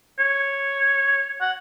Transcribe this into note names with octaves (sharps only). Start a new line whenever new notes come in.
C#5
F#5